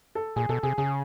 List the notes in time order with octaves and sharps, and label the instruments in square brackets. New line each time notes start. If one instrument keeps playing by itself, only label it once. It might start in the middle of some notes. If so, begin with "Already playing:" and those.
[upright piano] A4
[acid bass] A#2 [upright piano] G#4
[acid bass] B2 [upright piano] A4
[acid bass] C3 [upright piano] G#4
[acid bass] C#3 [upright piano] G#4